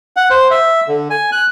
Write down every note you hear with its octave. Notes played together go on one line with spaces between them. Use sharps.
F#5
C5
E5
D3
G#5
F#6